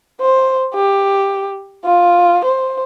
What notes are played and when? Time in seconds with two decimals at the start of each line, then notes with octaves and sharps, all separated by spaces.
0.20 C5
0.74 G4
1.85 F4
2.45 C5